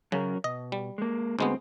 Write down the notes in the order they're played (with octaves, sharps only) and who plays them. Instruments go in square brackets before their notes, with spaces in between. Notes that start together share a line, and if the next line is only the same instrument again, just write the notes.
[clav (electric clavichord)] C#3 [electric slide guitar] F#3 C#4 A#4
[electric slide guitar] B2 [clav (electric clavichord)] D#5
[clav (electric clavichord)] G3
[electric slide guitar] G#3 A#3
[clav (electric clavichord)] D2 G#3 B3 [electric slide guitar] C4